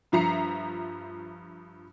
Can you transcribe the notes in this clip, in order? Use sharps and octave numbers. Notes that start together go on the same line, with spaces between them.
G2 F3 E5 A#5 C7 C#7